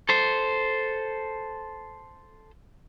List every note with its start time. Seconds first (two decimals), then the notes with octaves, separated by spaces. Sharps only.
0.09 A4 C5